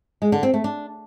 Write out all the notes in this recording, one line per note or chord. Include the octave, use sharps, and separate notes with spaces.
G#3
D3
C4
A3
D4